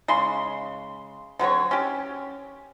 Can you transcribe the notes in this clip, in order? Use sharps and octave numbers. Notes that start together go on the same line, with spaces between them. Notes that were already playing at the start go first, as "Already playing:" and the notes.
C#3 G#3 C6
D3 F#3 C4 C#5
C#4 G4